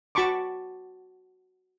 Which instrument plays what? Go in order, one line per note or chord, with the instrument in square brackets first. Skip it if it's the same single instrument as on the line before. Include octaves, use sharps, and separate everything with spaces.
[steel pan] F#4 A5 B5 C#6 D6